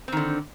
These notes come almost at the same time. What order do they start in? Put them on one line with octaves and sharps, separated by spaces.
C4 D#3 D3